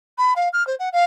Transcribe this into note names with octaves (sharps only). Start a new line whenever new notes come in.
B5
F5
F6
C5
F#5
F5